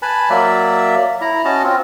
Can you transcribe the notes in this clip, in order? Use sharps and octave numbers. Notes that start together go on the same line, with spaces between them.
B4 G#5 A5 B5
F#3 A#3 D5 E5
E4 A#5
C#4 F#4 D#5 A5
C4 F4